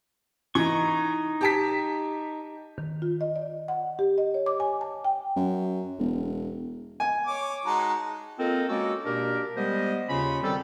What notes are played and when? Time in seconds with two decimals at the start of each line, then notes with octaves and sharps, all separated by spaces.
0.55 E3 D#4 C#6
1.41 G4 A5 B6
2.78 D#3
3.02 F4
3.21 D#5
3.36 D5
3.68 F#5
3.99 G4
4.18 D#5
4.34 C#5
4.46 D6
4.60 G#5
4.81 A5
5.05 G5
5.36 F#2
5.99 E1
7.00 G#5
7.27 C#5 D6
7.66 G#3 D#4 F#4 A5
8.39 A#3 C4 F4 A4 A#4 D#5
8.69 G#3 A#3 C#4 F#4 A4
9.04 B2 A#3 D4 G4 A#4
9.56 G3 G#3 B3 G4 C5 D#5
10.09 D#2 C#3 C#4 F4 B5
10.43 D#3 G3 C4 C#4 A4